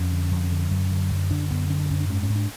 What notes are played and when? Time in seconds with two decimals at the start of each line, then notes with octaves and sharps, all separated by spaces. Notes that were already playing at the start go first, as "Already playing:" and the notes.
Already playing: F2 C#4
0.12 D3
0.31 F2
0.52 D3
0.71 F#2
0.91 D3
1.11 F#2
1.31 D3 D4
1.51 F#2 B3
1.70 D3 C#4
1.80 D4
1.90 F#2 C#4
2.00 D4
2.09 G#2 C#4
2.23 C#4
2.30 G#2
2.36 D4